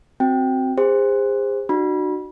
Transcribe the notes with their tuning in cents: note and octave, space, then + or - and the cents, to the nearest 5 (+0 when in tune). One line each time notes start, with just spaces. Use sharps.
C4 +0 F#4 +0 G5 +0
G#4 -40 C5 +0
D4 +45 F#4 +0 B5 -30